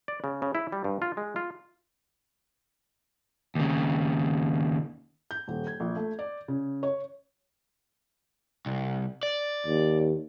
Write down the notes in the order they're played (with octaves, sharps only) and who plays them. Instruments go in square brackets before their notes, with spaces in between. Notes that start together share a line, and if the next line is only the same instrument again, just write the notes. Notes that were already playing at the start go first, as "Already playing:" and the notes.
[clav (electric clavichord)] D5
C#3
C#3
E4
G3
G2
F4
G#3
F4
[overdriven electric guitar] D#2 C#3
[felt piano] G6
D#1
G#6
A#1
A3
D5
C#3
C#5
[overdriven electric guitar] C2
D5
[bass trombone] D#2